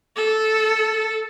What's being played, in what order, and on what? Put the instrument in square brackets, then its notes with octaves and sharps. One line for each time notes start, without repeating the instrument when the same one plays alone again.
[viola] A4